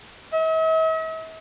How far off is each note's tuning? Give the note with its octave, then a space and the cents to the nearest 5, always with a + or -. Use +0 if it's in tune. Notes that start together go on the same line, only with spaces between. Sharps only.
E5 -45